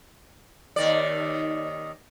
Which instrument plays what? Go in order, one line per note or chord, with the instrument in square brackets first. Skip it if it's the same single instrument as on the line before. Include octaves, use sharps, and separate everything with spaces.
[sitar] D#2 D#3 D5